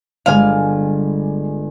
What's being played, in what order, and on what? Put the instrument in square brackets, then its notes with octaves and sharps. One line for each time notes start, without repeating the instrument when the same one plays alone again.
[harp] G1 [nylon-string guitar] G3 G#3 G#5 [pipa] F5